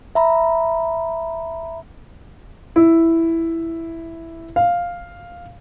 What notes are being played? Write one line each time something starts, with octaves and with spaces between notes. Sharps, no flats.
E5 A#5 B5
E4
F5